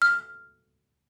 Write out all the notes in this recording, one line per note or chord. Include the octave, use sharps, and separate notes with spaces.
F6